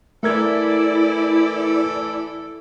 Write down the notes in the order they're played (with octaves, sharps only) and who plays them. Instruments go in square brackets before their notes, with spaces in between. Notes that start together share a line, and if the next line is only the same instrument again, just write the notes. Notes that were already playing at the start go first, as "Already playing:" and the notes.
[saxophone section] E3 A4 [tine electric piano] A3 A#4 G#6 [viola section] E4 D5